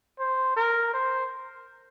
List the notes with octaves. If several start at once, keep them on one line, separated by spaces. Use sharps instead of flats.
C5
A#4
C5